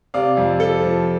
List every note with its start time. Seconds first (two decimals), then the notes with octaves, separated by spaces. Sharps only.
0.14 C3 D5 F5
0.37 F2
0.60 F3 A4
0.82 F3